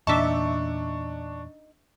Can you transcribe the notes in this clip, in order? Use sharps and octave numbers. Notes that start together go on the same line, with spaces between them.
E2 A#2 D4 D#4 E5 A5 C#6 D6